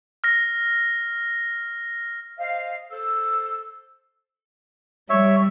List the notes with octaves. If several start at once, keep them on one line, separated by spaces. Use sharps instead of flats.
F6 A#6
C5 D#5 F5
A4 C5 E6
G3 C#5 E5